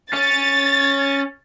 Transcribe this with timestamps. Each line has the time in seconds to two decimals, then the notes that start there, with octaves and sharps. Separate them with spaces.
0.13 C#4 A6